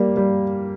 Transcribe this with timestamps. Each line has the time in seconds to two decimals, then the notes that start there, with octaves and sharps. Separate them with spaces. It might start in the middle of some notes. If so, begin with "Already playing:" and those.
Already playing: G3 A#3
0.17 G3